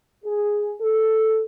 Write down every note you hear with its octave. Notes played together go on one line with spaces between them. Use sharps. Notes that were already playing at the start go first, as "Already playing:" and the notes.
G#4
A4